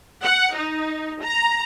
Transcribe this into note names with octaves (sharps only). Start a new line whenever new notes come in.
F#5
D#4
A#5